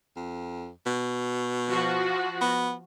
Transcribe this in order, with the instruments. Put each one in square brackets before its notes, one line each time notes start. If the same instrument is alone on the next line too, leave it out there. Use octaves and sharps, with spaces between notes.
[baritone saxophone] F2
B2
[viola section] F3 F#4
[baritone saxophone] B3